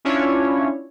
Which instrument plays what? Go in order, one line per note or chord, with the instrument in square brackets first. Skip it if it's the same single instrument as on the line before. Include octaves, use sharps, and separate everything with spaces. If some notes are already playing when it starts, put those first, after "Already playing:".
[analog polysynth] C#4 D4 E4 F4 C#5